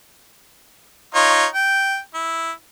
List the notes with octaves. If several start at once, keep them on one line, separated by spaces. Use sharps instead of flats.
D#4 F4 C#5
G5
E4